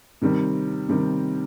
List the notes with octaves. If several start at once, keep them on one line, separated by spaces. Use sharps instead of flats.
C3 D#3 G3 C4
C3 D#3 G3 C4